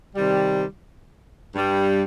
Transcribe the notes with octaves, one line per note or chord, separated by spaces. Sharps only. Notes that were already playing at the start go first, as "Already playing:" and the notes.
C3 D#3 G3
G2 G3